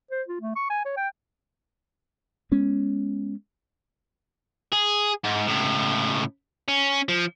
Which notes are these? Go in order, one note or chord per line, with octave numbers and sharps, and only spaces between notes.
C5
F4
A3
C#6
G#5
C#5
G5
G#3 B3 C#4
G#4
G#2
C#2 A2
C#4
F3